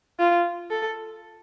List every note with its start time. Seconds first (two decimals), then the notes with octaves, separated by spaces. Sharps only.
0.19 F4
0.70 A4